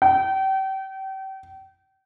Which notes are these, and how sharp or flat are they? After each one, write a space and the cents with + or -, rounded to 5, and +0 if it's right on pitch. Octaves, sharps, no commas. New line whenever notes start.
G5 -35